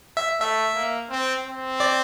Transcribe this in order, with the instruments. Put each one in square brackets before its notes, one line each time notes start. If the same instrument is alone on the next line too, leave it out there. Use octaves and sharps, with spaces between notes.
[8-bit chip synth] E5
[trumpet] A3 [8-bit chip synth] E5
[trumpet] A#3
C4
C4
[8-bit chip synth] D5